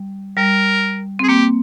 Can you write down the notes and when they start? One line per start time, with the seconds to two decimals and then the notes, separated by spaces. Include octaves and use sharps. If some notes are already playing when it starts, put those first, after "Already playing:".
Already playing: G3
0.37 G3 A#4
1.19 C4
1.23 G#4
1.28 A#3 G4